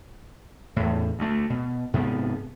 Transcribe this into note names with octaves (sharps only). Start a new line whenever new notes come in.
E2 A2
D2 A3
B2
G#2 C3 F3 B3